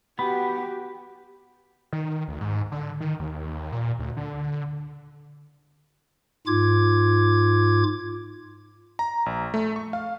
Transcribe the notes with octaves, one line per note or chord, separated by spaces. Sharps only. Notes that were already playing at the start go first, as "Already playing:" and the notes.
B3 F#4 G4 B5
D#3
D2
G#2
D3
D#3
D#2
A#2
D2
D3
G#2 F4 D6 G#6
A#5
A#1
A3
C#6
F5